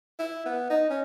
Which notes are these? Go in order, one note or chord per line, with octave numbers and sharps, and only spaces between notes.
E4
B3
D#4
C#4